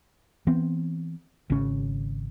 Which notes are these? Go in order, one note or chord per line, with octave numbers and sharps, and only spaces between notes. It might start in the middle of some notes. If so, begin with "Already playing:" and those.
E3 B3 C4
G#1 C#3 C#4